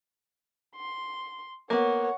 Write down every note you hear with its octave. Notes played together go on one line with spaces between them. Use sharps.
C6
A#3 B3 C#5 F#5